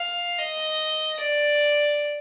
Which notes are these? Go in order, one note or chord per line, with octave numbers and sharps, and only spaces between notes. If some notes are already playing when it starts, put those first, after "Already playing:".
Already playing: F5
D#5
D5